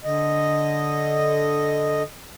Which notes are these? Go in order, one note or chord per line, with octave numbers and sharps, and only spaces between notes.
D3 D#5